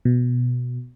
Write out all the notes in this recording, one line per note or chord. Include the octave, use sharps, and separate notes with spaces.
B2